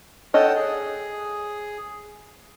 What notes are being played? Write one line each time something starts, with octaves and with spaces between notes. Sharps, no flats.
A4 C#5 D#5 F#5 G5 A5
G#4